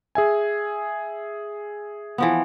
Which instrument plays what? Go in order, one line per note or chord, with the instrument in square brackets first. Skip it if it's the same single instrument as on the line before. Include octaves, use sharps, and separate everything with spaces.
[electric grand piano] G#4 E5 G#5
[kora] E3 F3 B3